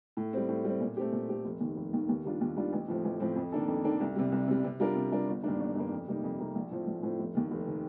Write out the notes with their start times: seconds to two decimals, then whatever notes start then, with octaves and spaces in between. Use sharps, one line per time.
0.17 A2
0.33 G3 C4
0.49 A2
0.64 G3 C4
0.80 A#2
0.97 A3 C4 G4
1.12 A#2
1.29 A3 C4 G4
1.45 F1
1.60 D#2 D#3
1.77 F1
1.93 D#2 D#3
2.09 D#2
2.24 D#3 G3 D4 F4
2.41 D#2
2.56 D#3 G3 D4 F4
2.73 A1
2.88 A2 F3 C4
3.05 A1
3.20 A2 F3 C4
3.36 F2
3.52 D#3 A#3 D4 A4
3.68 F2
3.84 D#3 A#3 D4 A4
4.00 C2
4.16 C3 G3
4.32 C2
4.48 C3 G3
4.64 C3
4.80 G3 D4 F4 A#4
4.96 C3
5.12 G3 D4 F4 A#4
5.28 G1
5.43 G2 D#3 A#3 D4
5.60 G1
5.76 G2 D#3 A#3 D4
5.92 F2
6.07 C3 G3 A#3 D#4
6.23 F2
6.39 C3 G3 A#3 D#4
6.55 A#1
6.71 A2 F3 C4
6.87 A#1
7.03 A2 F3 C4
7.19 F1
7.35 D#2 D#3
7.51 F1
7.67 D#3